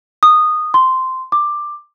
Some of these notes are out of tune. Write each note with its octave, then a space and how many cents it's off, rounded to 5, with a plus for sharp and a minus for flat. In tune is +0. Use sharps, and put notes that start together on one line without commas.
D#6 -15
C6 -10
D6 +15